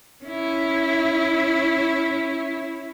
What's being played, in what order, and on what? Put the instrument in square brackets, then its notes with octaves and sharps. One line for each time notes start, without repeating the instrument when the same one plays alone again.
[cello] C#4 E4